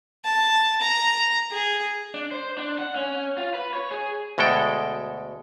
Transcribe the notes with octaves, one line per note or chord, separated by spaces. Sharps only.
A5
A#5
G#4
D4
C5
D4
F#5
C#4
F4
B4
C#5
G#4
D2 B2 G#3 A4 G5